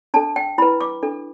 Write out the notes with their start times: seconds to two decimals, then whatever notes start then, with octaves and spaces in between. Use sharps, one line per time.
0.14 D4 A4 A5
0.36 G5
0.58 E4 B4 B5
0.81 D6
1.03 D4 A4